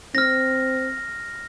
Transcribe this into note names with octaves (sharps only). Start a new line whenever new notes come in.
C4 F6 A#6